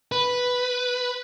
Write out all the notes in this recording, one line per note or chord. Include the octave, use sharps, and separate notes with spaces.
B4